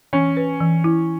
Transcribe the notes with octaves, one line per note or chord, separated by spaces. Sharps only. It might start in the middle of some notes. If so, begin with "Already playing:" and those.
E3 C#4
B4
E3
E4